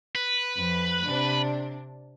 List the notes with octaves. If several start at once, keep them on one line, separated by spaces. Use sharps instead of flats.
B4
F2
C3 D4